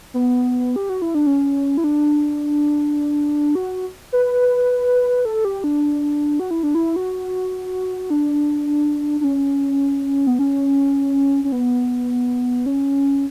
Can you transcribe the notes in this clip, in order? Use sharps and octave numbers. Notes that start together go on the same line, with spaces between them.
B3
G4
F#4
E4
D4
C#4
E4
D4
F#4
B4
A4
G4
D4
F#4
E4
D4
E4
F#4
D4
D4
C#4
B3
C#4
C#4
B3
C#4